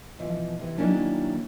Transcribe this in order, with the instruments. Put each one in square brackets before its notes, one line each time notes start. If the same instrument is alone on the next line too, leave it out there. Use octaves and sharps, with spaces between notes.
[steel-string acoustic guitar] B2 E3 F3
C3 E3
D#3 F#3 A#3 C#4 D4 E4